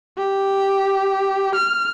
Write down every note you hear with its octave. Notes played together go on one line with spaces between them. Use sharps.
G4
F6